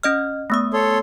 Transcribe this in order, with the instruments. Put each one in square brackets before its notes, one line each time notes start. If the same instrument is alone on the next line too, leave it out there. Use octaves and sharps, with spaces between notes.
[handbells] C#4 D#5 F6
A3 B3 D#6
[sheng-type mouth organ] A4 C#5 C6